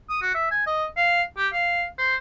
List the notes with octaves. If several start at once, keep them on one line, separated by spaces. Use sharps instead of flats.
D#6
F#4
E5
G#5
D#5
F5
G4
F5
C5